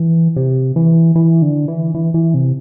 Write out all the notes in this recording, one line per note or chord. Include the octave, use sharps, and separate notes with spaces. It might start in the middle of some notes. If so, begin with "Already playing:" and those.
Already playing: E3
C3
E3
E3
D3
E3
E3
E3
C3